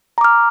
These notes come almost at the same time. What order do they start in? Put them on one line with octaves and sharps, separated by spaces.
A#5 D6 F6